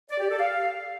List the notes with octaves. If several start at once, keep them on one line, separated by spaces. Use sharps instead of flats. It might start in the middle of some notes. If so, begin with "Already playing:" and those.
D5
G4
A4
F5